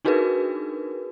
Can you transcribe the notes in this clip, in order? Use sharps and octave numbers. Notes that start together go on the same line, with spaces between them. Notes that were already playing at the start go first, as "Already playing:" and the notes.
D4 D#4 F#4 G#4 A#4 B4